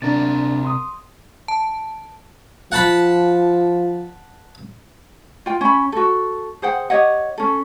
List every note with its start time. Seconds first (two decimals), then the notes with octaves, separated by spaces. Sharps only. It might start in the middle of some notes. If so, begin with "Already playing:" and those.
0.02 C3 D4 A#4 A6
0.65 C6 D#6
1.48 A5
2.72 F3 F#5 A5 B5
5.46 F4 G5
5.61 C#4 B5
5.92 F#4 A4
6.62 G#4 C5 F#5 G5
6.90 G4 C#5 D#5 F#5
7.38 C#4 A4